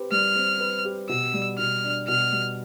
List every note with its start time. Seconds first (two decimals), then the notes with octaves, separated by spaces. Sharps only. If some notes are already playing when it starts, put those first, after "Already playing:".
Already playing: C4 G4 B4
0.11 G3 F6
0.35 C4
0.60 B4
0.85 G4
1.09 B2 E6
1.34 G3
1.58 B2 F6
1.83 D4
2.08 B2 F6
2.32 G3